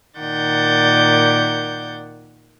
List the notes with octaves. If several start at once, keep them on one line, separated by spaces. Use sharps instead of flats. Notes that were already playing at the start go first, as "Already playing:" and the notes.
A#2 D#3 D5 F#5 G6 A6